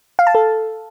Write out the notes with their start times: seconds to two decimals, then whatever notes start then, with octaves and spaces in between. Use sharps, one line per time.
0.19 F5
0.27 A5
0.35 A4